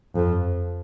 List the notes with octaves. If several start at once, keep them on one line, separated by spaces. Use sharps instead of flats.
F2